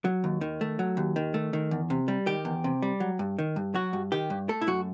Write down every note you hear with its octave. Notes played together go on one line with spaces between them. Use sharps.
F#3
D#2
D#3
A3
F#3
D#2
D#3
A3
D#3
E2
C3
G3
D#3 G4
E2
C3
G3
F#3
G2
D#3
G2
F#3 F#4
G2
D#3 G4
G2
A3 A4
E4
F#2 F#4